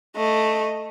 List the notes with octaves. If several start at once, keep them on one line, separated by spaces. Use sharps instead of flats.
A3 D#5